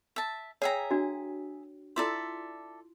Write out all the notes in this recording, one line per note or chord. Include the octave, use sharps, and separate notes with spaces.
E5 A5
G#4 C#5 E5 G5 A#5
D4 F#4
E4 F4 A4 D5 E5 C6